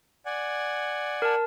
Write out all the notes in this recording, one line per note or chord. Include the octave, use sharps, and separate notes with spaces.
D5 F#5 G#5
A#4 A5